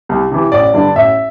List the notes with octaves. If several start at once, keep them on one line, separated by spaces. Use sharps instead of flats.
C2
C3 E3
A1 D5
G2 D3
A1 E5